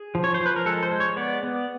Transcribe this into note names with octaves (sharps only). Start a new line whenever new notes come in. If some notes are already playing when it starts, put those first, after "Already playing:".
Already playing: G#4
F3
C#5
C5
F3 B4
A#4
G#3 A4
C5
G#3
C#5
B3 D5
B3